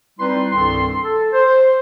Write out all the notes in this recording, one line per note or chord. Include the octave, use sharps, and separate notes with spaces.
G3 C4 D#4 E4 B4 C6
C2 G2 D#3 C4 A4 C6
A4
C5